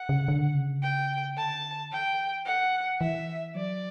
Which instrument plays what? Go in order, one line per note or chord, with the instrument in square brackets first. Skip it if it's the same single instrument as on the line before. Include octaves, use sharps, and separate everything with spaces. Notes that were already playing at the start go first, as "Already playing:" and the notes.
Already playing: [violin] F#5
[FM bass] C#3
D3
C#3
[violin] G5
[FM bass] D3 [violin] A5
[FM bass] E3 [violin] G5
[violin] F#5
[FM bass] E3 [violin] E5
[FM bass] F#3 [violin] D5